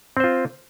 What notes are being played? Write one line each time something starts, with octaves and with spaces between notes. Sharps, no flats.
C4 F4 C5